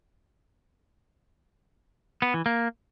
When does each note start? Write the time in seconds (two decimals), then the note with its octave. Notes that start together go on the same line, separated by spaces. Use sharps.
2.22 B3
2.34 E3
2.46 A#3